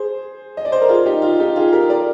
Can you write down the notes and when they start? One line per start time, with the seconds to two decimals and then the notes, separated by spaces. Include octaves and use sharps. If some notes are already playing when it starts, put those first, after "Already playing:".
Already playing: G#4 C5
0.57 D#5
0.65 D5
0.72 C5
0.81 A#4
0.89 F4 G#4
1.06 D#4 G4
1.22 F4
1.40 D#4 G4
1.56 F4 G#4
1.73 G4 A#4
1.90 A#4 D5